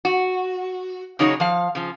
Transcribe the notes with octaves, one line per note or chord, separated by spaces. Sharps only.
F#4
C#3 F#3 D#4 G#4 C#5
F3 F5
C#3 F3